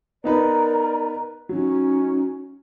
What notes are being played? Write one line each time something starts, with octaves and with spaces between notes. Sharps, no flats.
B3 D#4 A#4 B4 D5 A#5
F#3 C#4 D#4